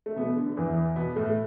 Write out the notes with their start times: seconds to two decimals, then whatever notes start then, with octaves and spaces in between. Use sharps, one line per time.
0.06 A3
0.16 B2 B3
0.36 D3
0.57 E2 E3
0.96 B2 B3
1.16 A2 A3